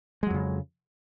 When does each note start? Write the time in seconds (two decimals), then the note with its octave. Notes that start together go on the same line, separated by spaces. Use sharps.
0.23 G#3
0.27 F#3
0.30 F2
0.34 C#3